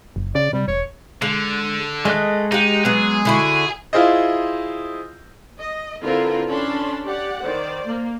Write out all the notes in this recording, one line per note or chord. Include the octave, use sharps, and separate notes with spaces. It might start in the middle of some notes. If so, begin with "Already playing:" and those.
F#1
C#3 D5
C3 G3
E1 C#5
D3 G#3
G#3 A3 D#5 F#6
D#4 G4 F#5
F#3 B3 G#4
D3 E4 F#4
E4 F4 G#4 C5 D#5
D#5
D3 C4 E4 F4 A#4 B4
C#4 D4 A4 A5 B5 C6
G4 D5 F#5
D#3 C5 D5
A#3